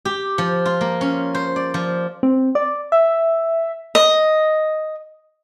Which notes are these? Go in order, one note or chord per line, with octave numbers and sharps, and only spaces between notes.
G4
F3
F4
A#3
C#4
C5
D5
F3
C4
D5
E5
D#5